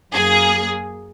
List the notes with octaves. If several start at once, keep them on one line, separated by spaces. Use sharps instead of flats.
F#2 F#3 A#3 G#4